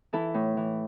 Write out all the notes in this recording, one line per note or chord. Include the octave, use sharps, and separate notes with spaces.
E3 E4 A4
A2
E3